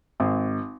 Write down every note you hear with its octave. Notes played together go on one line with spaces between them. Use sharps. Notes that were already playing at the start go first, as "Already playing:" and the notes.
G#1